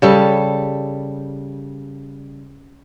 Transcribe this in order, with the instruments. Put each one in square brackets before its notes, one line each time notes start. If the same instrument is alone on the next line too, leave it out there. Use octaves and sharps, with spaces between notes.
[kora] C#3 G3 A4